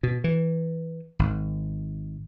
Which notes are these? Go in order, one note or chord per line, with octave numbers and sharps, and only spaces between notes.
B2
E3
G#1